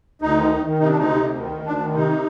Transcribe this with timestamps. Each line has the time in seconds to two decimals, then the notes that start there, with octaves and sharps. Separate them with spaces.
0.22 D2 D#4
0.37 D#3
0.52 D#3
0.65 D#3
0.79 C3 D#4
0.88 D4
0.93 D2 D#4
1.08 C3
1.23 D2
1.38 D#3
1.52 D2
1.66 D2 D4
1.80 D#3
1.94 C3 D#4